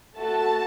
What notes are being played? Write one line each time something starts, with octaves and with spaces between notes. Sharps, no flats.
A3 F#4 A4 A5